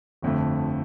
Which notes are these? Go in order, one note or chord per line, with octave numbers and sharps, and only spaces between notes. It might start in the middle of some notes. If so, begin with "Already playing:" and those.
G1 F2 D3 A3